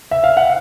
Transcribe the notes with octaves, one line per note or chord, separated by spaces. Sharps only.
E5
F5
F#5